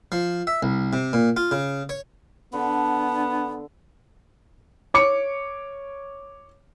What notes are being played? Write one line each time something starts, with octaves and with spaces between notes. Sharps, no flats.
F3
E5
C2
C3
A#2
F4
C#3
C#5
D3 B3 D4 A4
C#5 D6 C#7